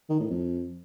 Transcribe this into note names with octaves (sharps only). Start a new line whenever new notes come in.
D#3
A2
F2